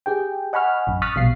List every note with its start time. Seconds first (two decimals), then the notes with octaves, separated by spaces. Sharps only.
0.06 G4 G#4 G5
0.53 D#5 F#5 G#5 B5 C#6 F6
0.87 A1 F#2
1.02 C#6 D#6 F6 F#6 A6 B6
1.15 A#1 B2 G3 F5 C7